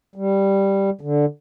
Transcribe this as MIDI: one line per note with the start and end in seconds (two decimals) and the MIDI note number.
0.16 0.90 55
1.01 1.25 50